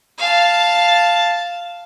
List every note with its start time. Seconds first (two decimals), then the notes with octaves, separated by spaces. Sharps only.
0.18 F5 A5